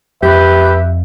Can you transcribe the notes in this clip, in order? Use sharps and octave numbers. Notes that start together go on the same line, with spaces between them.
F2 G4 B4 E5